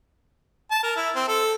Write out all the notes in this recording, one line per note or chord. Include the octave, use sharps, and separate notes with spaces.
A5
A#4
E4
C4
A4